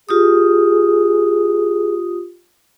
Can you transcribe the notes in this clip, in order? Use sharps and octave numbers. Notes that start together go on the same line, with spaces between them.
F4 G4 G#4 D#6